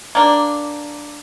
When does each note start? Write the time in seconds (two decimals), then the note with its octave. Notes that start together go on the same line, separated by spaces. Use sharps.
0.15 A#3 D4